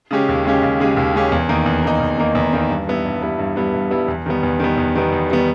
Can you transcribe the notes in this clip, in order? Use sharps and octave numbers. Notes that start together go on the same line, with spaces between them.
C#3 G#3 C#4 G4
D#2
C#3 G#3 C#4 G4
D#2
C#3 G#3 C#4 G4
D#2
C#3 G#3 C#4 G4
E2
D#3 A#3 D#4
E2
D#3 A#3 D#4
E2
D#3 A#3 D#4
E2
D#3 A#3 D#4
G2
G3 B3 E4
G2
G3 B3 E4
G2
G3 B3 E4
G2
G3 B3 E4
E2
D#3 G3 B3
E2
D#3 G3 B3
E2
D#3 G3 B3
E2
D#3 G3 B3